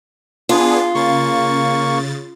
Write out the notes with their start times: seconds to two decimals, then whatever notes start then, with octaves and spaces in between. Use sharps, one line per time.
0.49 B3 D4 F4 G#4
0.95 C#3 A#3 C#6 A6